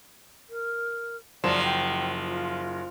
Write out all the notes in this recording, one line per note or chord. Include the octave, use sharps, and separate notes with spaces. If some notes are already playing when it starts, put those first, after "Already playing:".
A#4
F#1 F3 F#3 D5 E7
G5
F4